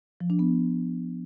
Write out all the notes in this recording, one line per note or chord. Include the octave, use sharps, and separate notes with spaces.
F3
D4
B3